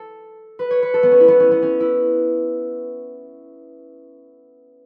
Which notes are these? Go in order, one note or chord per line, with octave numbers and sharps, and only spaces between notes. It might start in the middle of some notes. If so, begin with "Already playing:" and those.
Already playing: A4
B4
C#5
B4
A4
B3
C#4
E4
B3
C#4
B3
C#4
E4